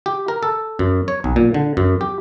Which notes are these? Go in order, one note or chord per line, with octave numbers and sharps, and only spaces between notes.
G4
A#4
A4
F#2
C#5
B1
A#2
D3
F#2
G4